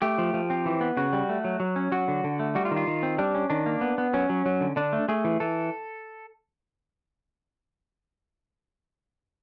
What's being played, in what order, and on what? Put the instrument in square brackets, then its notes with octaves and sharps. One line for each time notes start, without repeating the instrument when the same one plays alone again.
[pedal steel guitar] A3 G4
F3
F3
C4
E3
B3
C#3 F#4
G3
A3
F#3
F#3
C#4
F#3 F#4
D3
D3
A3
G3 F#4
F4
D#3
F4
D#3
C4
G3 D4
C#4
D#3 D4
A#3
B3
B3
F#3 C#4
F#3
F#3
D3
D3 D4
A3
A3 G#4
E3
E3 A4